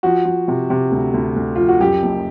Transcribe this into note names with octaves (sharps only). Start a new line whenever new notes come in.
F3 F#4
F3
C3
C3
D2
D2
D2
F3 F4
F#4
F#2 G4
F#1